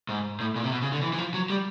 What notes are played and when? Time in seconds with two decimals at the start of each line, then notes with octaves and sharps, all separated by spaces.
0.09 G#2
0.40 A2
0.56 A#2
0.64 C3
0.72 B2
0.82 C#3
0.92 D3
1.02 E3
1.13 E3
1.18 F3
1.34 F#3
1.50 G3